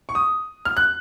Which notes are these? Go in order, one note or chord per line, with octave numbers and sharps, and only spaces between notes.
C#6
D#6
F6
F#6